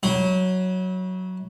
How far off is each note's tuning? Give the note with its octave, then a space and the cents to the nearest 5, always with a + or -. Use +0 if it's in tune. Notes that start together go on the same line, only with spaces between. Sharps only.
F#3 +0 E4 -35